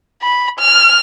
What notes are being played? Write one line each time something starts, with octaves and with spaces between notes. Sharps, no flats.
B5
F6